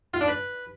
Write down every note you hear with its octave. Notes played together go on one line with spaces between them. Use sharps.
F4
D4
B4